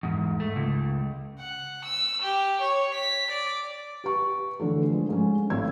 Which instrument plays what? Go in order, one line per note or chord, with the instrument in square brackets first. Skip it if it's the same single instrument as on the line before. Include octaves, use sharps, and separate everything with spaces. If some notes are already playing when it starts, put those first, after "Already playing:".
[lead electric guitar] E2 G#2
A3
C#2
[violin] F#5
E6
G4
C#5
B6
D5
[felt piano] G4 B4 C#6
D3 E3 A3
F3 G#3
G#2 C#4
G#1 A2 E6 G#6